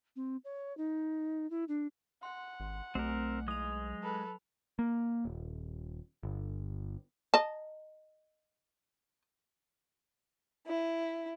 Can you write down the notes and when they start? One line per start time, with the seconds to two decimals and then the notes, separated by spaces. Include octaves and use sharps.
0.16 C4
0.44 C#5
0.77 D#4
1.50 E4
1.68 D4
2.23 F#5 C6
2.60 G#1
2.95 B1 A3 C4 A#4
3.48 F#3 G#3 D#6 F7
4.02 A4 B4
4.79 A#3
5.25 D#1
6.23 G1
7.34 D#5 A5
10.67 E4